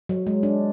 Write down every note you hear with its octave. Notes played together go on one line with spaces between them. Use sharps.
F#3
G#3
D4